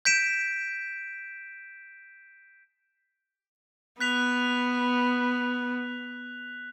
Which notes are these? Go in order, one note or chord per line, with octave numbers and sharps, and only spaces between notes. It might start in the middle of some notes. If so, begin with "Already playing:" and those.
G6 B6 D7 E7
B3 F#6 B6 F7